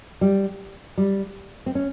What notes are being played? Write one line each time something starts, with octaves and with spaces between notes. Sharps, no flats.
G3
G3
C4
C#4